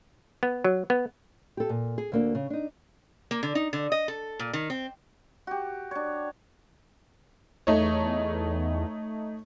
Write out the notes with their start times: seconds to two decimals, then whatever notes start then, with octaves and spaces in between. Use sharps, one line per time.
0.43 B3
0.64 F#3
0.90 B3
1.57 G4 A4
1.69 A#2
1.98 G#4
2.12 D2 A#3 D4
2.35 C#3
2.50 D4 D#4
3.31 A#3
3.43 D3
3.55 D#4
3.73 D3
3.92 D#5
4.08 A4
4.39 A#2
4.53 D#3
4.70 C4
5.47 F#4 G4
5.91 D4 C#5
7.67 E2 A3 D#4 C#5